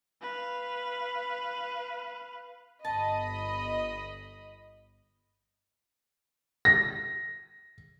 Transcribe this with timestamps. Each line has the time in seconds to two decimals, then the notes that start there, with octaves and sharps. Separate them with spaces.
0.22 B4 F5
2.85 G1 D#5 A5 B5
6.65 A#6